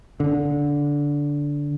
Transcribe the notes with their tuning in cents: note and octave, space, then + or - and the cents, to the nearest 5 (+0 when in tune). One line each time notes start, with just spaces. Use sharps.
D3 -15